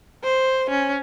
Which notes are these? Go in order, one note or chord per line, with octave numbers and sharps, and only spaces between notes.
C5
C#4